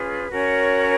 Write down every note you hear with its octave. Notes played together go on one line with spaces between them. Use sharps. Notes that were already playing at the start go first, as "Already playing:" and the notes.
Already playing: C#4 F4 G#4 B4
C#4 F#4 A#4 C#5